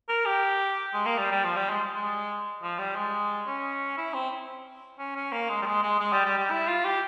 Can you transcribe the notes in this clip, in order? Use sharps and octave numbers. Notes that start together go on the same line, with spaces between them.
A#4
G4
G#3
A#3
G3
G3
F3
G3
G#3
G#3
F3
G3
G#3
C#4
E4
C4
C#4
C#4
A#3
G#3
G3
G#3
G#3
G#3
G3
G3
G3
E4
F4
G4